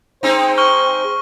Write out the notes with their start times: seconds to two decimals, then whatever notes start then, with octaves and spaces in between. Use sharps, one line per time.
0.23 G#3 C4 D#4 C5
0.58 C#6 F6 G7